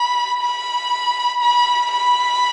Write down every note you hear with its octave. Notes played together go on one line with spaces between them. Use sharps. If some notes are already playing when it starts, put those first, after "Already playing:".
Already playing: B5
B5
B5
B5